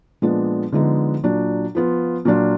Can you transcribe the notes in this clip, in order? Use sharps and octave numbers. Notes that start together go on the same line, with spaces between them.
A#2 F3 G#3 B3 D4
D3 F3 G#3 B3 D#4
A#2 F#3 D4
F3 B3 F4
A#2 F#3 D4 F4